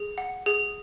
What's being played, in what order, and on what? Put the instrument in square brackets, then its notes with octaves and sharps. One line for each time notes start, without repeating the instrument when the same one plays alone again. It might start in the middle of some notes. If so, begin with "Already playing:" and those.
Already playing: [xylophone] G#4
F#5
G#4